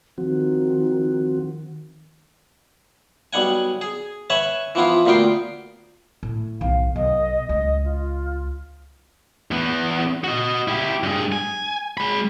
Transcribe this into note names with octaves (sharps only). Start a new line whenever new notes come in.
D#3 F3 C4 F#4
B1 G3 F#5 G#5
G#4
B4 C#5 E5 F#5 G#5
E3 F3 B3 E4 F4
D2 A#2 B3 F4 G5 C6
A2
B1 D#3 F5
B1 D#5
C#2 D#5
F4
E2 B3
F#4 D#5
E4 G4
G2 G#4
G#5
G#3 B5